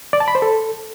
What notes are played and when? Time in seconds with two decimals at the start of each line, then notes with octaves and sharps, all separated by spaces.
0.13 D5
0.20 A5
0.28 B5
0.35 C5
0.42 A4